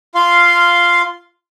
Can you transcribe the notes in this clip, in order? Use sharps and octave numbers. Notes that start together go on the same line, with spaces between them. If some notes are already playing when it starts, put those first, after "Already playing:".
F4 F5 C6